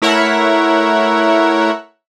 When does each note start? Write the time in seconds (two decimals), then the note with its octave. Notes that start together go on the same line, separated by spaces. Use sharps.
0.02 A3 E4 A#4 C#5 E5 F#5